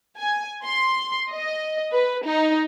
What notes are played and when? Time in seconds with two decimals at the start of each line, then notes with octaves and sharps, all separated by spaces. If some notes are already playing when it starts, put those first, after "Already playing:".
0.18 G#5
0.64 C6
1.31 D#5
1.93 B4
2.26 D#4